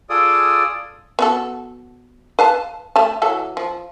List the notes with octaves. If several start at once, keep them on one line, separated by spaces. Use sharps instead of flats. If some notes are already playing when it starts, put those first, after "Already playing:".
F4 G#4 A4 D5 D#6
B3 F#4 A4
B4 F5 A5
A3 A5
E3 F#3 A4
F3